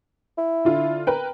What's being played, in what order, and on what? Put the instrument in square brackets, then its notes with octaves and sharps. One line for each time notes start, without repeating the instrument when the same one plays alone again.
[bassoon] E4
[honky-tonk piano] D3 F4
A#4 B4 G5